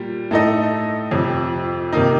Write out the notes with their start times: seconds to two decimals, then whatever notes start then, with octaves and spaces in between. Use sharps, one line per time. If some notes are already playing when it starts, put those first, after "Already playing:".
Already playing: A#2 G3
0.31 A2 A3 D#4 A4 D#5
1.11 F2 C3 F3
1.93 C3 D#3 A#3 D#4